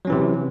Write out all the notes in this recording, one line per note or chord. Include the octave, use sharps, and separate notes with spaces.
C3 E3 F#3 C#4